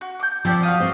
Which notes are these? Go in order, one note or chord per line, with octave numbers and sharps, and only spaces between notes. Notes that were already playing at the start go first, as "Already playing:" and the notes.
F#4
D6 G6
F3 C4 G4 D5
F#4 F5 D#6
C4 C5